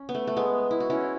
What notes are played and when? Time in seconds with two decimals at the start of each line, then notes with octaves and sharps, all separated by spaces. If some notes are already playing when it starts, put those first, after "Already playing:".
Already playing: C#4
0.09 B3
0.15 A3
0.27 A3
0.37 G#3 B3
0.71 E4
0.80 F#4
0.90 C#4 E4